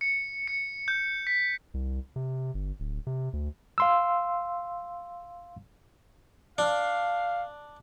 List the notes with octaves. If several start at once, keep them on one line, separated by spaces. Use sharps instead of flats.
C#7
C#7
G6
B6
C2
C3
G1
D1
C3
D2
F5 C6 E6
D4 F5